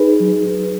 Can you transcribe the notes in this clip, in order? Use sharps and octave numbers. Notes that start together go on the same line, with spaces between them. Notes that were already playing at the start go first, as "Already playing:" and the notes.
Already playing: D#4 G#4 B4
F#3